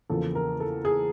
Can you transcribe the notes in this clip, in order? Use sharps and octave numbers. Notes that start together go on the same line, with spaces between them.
E2 C#3 F3 A#3 A4
A#4
A4
G#4